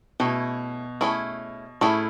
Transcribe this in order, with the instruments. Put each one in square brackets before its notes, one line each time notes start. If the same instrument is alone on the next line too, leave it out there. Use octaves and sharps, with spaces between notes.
[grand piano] B2 [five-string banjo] A3 C#4 E4 G#4
[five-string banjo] A3 C#4 E4 G#4
[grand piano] A2 [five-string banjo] A3 C#4 E4 G#4